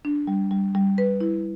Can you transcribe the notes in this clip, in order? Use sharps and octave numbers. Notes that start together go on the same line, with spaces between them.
D4
G3
G3
G3
B4
E4